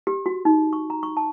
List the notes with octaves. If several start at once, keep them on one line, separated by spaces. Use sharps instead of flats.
G4
F#4
D#4
C#6
A#5
C#6
A5